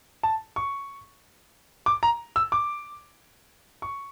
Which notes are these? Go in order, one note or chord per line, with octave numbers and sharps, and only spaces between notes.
A5
C#6
D6
A#5
E6
D6
C#6